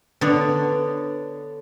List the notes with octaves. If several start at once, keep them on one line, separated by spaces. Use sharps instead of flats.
D3 B3 C#5 D5